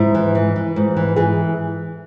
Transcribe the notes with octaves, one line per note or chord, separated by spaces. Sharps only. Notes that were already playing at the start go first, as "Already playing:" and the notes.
Already playing: G#2 E4
E3
E3
E3
G#2
E3
E3 G#4